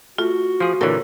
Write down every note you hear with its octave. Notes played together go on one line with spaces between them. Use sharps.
A3 F4 F#4
F3 G#4 C6
A#2 D3 E3 A4 A#4 C#5